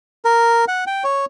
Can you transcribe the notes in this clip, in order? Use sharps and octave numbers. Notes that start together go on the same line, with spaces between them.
A#4
F#5
G5
C#5